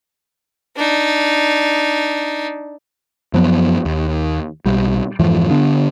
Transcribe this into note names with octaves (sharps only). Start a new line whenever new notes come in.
D4 D#4
F#2 F3 F#3 B3
D#2
B1 G3
F2 G#2 E3 F3
D3 B3 D4